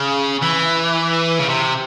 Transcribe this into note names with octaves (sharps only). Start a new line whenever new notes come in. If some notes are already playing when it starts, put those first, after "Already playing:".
Already playing: C#3
E3
C#3
C3